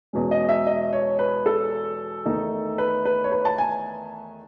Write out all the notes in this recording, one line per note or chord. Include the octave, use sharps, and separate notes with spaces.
E2 B2 G#3 C#4
D#5
E5
D#5
C#5
B4
A4
E2 D#3 A3 D#4
B4
B4
C#5
B4
A5
G#5